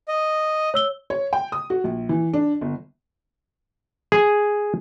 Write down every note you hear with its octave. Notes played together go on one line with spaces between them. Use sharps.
D#5
C#5 E6 G7
C#5
G5
D#6
F#4
A#1
E3
D4
G1
G#4